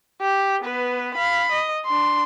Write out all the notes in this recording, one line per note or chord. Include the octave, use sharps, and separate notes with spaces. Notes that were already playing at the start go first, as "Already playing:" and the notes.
G4
B3 B4
F5 B5
D#5
D4 C6